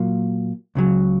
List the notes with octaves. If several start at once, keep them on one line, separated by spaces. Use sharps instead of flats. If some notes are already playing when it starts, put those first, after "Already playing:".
Already playing: A#2 F#3 A#3 F4
C#2 C#3 F#3